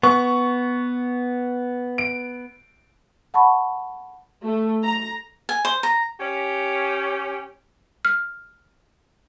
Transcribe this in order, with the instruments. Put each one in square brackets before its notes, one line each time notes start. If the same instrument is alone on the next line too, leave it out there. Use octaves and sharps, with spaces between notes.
[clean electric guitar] B3 [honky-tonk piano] C#6
[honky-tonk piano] D7
[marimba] F#5 A5 B5 C#6
[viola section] A3
A#5
[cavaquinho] G#5
C5
A#5
[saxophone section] C#4 G4
[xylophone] F6